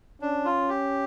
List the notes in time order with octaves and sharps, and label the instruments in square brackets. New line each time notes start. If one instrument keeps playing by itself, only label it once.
[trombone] C#4 [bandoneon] D4
[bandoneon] F4
G4